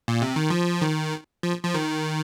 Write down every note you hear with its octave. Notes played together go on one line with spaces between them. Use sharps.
A#2
C3
D#3
F3
D#3
F3
F3
D#3